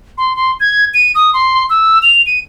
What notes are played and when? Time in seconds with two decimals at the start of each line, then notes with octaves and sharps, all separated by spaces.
0.18 C6
0.36 C6
0.60 G#6
0.94 D#7
1.15 D#6
1.34 C6
1.70 E6
2.03 F7
2.26 D#7